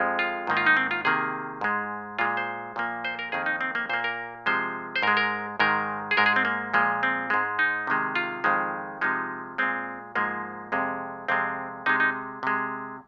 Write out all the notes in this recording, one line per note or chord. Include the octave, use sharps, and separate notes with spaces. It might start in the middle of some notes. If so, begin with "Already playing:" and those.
Already playing: F2 F3 G#3
F4
G#2 D#3 A#3
F4
D#4
C4
F4
C3 D#3 A#3 G#4
G#2 G#3
A#2 G#3 F4
C5
A#2 F3 A#3
C5
A#4
F2 D#3 A#3 G#4
D#4
C4
A#3
A#2 A#3 C5
A#4
C3 F3 G#3 C5
C5
G#2 G#3 A#4
A#4
G#2 D#3 G#3 A#4
G#4
G#2 G#3 A#4
G#4
C4
A#3
A#2 F3 G#3
C4
G#2 G#3
D#4
C3 D#3 G#3
F4
F2 D#3 G#3
C3 F3 G#3 D#4
A#2 G#3 C4
G#2 F3 G#3 A#3
F2 C3 G#3
F2 C3 G#3 C4
C3 G#3 D#4
D#4
C3 G#3